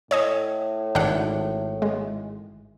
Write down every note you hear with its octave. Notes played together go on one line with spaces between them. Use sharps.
A2 C#5 D#5 G#5
G#1 D4 F#5
G#3